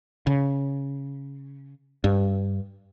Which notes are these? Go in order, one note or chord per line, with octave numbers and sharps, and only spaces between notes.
C#3
G2